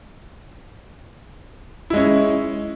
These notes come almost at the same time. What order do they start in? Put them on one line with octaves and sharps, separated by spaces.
E4 G#3 C#4